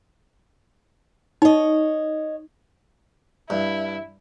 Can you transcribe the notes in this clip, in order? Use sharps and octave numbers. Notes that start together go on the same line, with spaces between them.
D#4 C#5 D#5
G2 E4